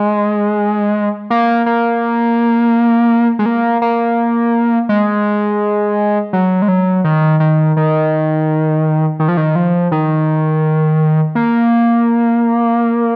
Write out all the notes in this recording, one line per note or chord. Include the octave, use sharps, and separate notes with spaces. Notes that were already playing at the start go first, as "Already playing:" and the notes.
Already playing: G#3
A#3
A#3
G#3
A#3
A#3
G#3
F#3
G#3
F#3
D#3
D#3
D#3
D#3
F3
D#3
F3
D#3
A#3